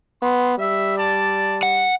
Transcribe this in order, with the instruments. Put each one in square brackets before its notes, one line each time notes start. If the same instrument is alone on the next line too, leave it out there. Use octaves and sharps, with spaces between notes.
[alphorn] B3 [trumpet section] C6
[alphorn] G3 [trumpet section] E5
[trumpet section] D5 A5
[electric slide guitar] F#5